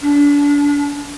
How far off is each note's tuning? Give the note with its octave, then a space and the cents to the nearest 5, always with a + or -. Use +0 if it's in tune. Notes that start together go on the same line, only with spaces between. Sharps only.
D4 -30